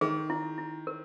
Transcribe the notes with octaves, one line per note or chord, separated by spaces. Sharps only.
D#3 G#4
E4
E4
A#4